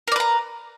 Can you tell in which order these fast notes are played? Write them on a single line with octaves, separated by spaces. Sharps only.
A#4 D5 B4 A#5